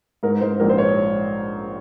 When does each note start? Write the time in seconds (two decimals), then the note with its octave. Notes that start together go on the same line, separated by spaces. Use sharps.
0.23 G#2 A#4
0.41 G#2 C5
0.60 A#1 A#4
0.69 C5
0.78 C#5